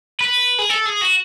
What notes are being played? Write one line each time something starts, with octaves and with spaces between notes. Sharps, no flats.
B4
G#4
A4
G#4
F#4